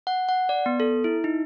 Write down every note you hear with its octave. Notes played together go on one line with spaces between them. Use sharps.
F#5
F#5
D5
B3
A4
E4
D#4